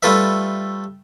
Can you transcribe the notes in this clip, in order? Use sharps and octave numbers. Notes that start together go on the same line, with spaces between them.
G3 A3 F4 A4 B4 E5